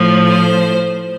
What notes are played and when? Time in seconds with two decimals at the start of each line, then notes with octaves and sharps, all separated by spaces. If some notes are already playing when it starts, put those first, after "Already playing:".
Already playing: A2 F3
0.28 C5